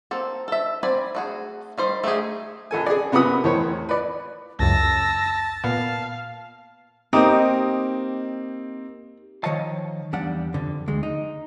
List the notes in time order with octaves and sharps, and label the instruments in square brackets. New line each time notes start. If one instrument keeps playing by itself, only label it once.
[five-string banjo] A#3 C4 A4
A4 E5
C4 D5 G#5 B5
A3 F#4 G#4
D#3 G3 C5
A3 D#4 G4 G#4
[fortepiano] A#1 A4 G#5
G#4 D5
F#2 C3 B3 F#5 B5 D#6
E2 A2 D#3 C5 C#5
B4 D5
[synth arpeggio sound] C#2 F#2 [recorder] A5 [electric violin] E6 A#6
[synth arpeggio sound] A#2 B3 [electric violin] F5
[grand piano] A#3 C4 [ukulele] D#4 [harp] G4 D#5
[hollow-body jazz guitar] D#3 F3 C#5 D#5 F5 A5
E2 G3 D4 F5 F#5
F2 D3
D2 G#3
D#4